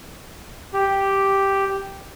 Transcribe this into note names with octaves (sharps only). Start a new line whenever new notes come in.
G4